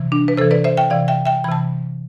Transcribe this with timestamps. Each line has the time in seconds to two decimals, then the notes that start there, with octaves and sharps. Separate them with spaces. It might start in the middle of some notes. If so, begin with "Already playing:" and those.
Already playing: C3 E3
0.12 D4
0.28 B4
0.37 C3 E3 A4 C5
0.51 B4 D5
0.64 C5 E5
0.77 E5 G5
0.90 C3 E3 D5 F5
1.08 E5 G5
1.25 E5 G5
1.44 E3 B5
1.49 C3 A5